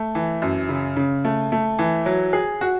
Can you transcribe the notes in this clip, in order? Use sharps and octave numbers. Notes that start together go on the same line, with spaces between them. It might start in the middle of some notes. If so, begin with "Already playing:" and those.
Already playing: A3
E3
F#2
C#3
C#3
A3
A3
E3
F#3
G#4
F#4